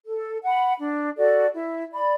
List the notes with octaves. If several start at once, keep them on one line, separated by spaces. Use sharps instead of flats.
A4
F#5 B5
D4
F#4 A4 D5
E4
D5 B5